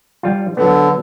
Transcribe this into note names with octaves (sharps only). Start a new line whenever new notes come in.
G3 F4
D3 F#3 B3